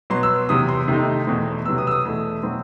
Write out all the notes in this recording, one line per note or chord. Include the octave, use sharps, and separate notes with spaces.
B2 F#3 B3 C6
E6
E2 C3 F#3 D#6
C6
C3 D#3 A3 D#4
E2 B2 A3 C4
C3 F#3 B3 E6
D#6
E6
D#6
E2 B2 A3
B2 F#3 C4